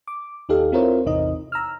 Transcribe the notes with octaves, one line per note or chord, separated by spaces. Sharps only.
D6
D#2 D#4 G4 A4 F5
C4 E4 F4 A#4 C5 C#5
A1 E2 C3 D#4 D#5
A#5 E6 F6